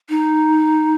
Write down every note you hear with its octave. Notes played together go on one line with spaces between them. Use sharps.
D#4